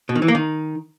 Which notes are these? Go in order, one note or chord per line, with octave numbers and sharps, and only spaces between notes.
B2
D#3
E3
A#3
D#3